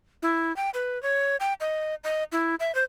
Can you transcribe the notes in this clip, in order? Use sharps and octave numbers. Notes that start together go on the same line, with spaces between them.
E4
G5
B4
C#5
G5
D#5
D#5
E4
E5
C5